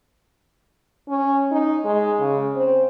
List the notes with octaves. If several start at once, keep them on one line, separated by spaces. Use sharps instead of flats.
C#4
D#4
G#3
C#3
C4